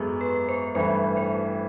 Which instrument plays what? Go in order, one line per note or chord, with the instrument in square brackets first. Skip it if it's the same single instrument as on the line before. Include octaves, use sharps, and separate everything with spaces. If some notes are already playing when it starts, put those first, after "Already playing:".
Already playing: [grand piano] G#1 F#2 G#3 B3 [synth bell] G#4 A4
[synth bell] B4
C5
[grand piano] A1 G2 E3 A3 [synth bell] C5
[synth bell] C5